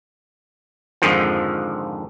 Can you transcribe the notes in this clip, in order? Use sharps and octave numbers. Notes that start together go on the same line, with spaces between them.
F2 G#2 D3 D#3 F3